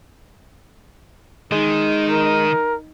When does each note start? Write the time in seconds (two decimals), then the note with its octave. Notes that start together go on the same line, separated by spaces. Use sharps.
1.52 D#3 G#3 D#4
2.10 A#4